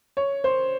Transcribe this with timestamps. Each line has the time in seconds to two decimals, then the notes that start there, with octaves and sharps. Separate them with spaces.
0.17 C#5
0.44 C5